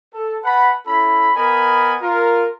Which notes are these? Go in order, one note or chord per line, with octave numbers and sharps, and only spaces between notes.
A4
B4 F#5 A5 B5
C#4 E4 A4 B5
B3 A#4 D#5 G#5 B5
F4 A#4